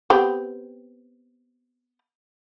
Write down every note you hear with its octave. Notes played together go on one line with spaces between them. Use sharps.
B3 C4 G4